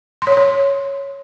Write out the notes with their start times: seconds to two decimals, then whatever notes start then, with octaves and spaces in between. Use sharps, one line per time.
0.22 C6
0.27 C#5
0.32 C6
0.37 C#5